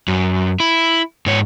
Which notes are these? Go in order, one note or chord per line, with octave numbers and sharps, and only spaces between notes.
F#2
E4
G#2 C#5